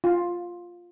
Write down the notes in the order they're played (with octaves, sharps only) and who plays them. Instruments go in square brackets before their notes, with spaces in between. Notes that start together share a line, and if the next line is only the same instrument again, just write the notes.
[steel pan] F4